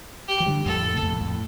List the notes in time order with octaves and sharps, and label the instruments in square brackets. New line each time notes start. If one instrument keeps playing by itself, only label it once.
[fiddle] G4
[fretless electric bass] F3
D3 G3
[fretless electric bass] F2 A2 [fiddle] A4
[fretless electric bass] C3
F2 A2
F2 A2